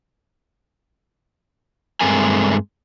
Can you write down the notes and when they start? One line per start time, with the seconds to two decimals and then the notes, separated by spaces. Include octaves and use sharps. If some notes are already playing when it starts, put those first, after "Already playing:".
2.01 G2 G#3 A3 C4 A#4 G#5